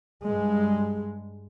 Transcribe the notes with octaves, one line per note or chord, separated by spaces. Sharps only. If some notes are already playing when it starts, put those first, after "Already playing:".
G2 G#3